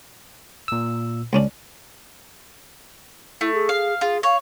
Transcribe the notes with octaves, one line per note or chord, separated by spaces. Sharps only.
A#2 E6
C#2 C#4 D4
A3 E4
G#4
F5
F4 G#4
C#5 F5